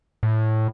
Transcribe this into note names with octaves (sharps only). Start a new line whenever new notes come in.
A2